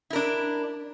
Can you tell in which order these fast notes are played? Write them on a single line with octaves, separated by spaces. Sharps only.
E4 A#4 D4